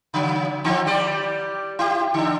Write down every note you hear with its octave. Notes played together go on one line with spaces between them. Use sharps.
C#3 F#3
D3 F3 C4
G3 G4 D5
E4 G4
D3 D4